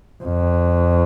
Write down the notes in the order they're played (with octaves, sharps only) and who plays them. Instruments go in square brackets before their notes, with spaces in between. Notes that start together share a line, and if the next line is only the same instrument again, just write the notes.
[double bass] F2